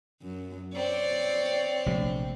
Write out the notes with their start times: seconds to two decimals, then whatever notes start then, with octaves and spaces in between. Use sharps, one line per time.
0.22 F#2
0.74 C4 C#5 D5
1.86 A#1 C3 A3